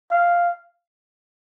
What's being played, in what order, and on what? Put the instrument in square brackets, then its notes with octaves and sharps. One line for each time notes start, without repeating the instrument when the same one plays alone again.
[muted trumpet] F5